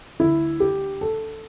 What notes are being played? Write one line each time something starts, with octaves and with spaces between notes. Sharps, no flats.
D2 D3 E4
G4
A4